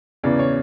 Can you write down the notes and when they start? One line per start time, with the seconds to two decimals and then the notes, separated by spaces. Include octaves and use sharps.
0.23 E2 C#3 E3 D5
0.39 C#5